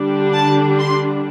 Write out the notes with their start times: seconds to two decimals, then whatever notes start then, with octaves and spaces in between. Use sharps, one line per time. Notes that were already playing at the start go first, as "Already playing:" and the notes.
Already playing: D3 G3 D4
0.34 A5
0.79 C6